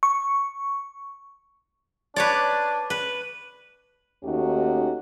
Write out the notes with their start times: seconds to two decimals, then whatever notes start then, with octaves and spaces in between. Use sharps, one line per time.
0.03 C#6
2.16 D4 B4 C#5 D5
2.90 B4
4.24 D#2 A3 C#4 D#4 F#4 G4